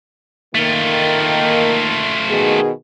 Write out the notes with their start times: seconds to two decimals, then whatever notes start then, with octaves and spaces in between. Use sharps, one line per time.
0.55 D#3 A3 A#3 F4
2.28 B2 D#3 G#4